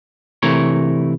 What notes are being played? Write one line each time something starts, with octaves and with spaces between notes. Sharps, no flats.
C3 E3 A3 A#4 C#5